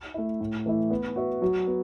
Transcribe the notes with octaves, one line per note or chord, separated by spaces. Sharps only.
A3 E4
A2
E3 A3 E4
B3
F#4 B4 E5
F#3
B3